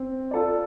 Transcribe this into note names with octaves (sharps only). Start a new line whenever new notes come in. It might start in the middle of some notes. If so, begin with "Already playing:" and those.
Already playing: C4
F4 A4 D5